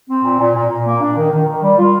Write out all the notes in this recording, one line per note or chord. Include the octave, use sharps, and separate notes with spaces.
C4
A#2
A#2
A#2
A#2
A#3
D4
D#3
D#3
D#3
G3
F4